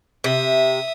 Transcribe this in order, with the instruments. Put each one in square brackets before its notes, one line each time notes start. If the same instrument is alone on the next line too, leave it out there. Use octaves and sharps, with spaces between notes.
[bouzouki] C3 [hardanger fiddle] E5 D#6